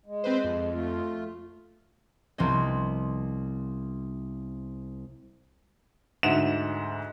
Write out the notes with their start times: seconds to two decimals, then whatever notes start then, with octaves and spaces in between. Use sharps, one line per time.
0.06 G#3
0.24 C4 B4 C5
0.44 F2
0.72 A3 F4
2.38 C2 F3 B3 C4 D#5
6.23 D2 G#2 E5 F#5 E7